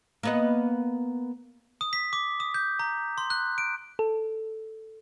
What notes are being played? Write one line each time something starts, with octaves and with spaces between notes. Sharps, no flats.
A#3 B3 D#5
D#6
B6
D6
D#6
G6
A#5
C6
F#6
D7
A4